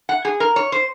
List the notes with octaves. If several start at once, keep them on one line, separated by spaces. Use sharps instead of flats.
F#5
G#4
A#4
C#5
C5